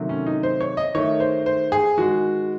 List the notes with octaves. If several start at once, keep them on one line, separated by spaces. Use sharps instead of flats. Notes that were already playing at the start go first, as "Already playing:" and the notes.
Already playing: C3 D#3 F#3 A3
C#4
D#4
C5
C#5
D#5
D#3 A3 C#5
C5
C5
G#4
D#3 G#3 F#4